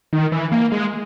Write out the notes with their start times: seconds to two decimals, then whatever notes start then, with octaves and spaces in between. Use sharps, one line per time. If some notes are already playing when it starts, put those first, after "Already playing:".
0.13 D#3
0.32 E3
0.52 A#3
0.72 G#3